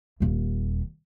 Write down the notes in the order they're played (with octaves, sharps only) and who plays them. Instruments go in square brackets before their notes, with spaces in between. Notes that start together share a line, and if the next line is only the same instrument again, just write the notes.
[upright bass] D#1 D#2